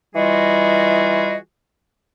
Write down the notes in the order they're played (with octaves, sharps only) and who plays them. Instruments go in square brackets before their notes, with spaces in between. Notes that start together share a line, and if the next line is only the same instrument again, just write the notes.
[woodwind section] E3 G3 F4 F#4 G#4 D#5